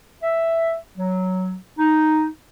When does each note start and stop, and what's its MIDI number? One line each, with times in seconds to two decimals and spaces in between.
0.22 0.77 76
0.97 1.54 54
1.79 2.25 63